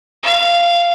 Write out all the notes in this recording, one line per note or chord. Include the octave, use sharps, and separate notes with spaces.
F5